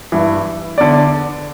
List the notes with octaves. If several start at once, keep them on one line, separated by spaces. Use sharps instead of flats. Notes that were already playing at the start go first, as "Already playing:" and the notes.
G2 E3
E2 D3 D5